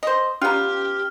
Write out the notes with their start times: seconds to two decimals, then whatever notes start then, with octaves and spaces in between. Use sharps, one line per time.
0.03 C5 D#5
0.42 B3 C#4 F4 G4 D5 A#5 F6